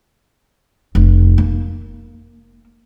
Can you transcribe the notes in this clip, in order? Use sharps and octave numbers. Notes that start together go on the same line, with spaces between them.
F1
A#3